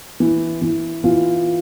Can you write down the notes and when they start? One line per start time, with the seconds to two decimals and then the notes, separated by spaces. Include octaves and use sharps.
0.20 E3
0.62 E3
1.04 E3 F4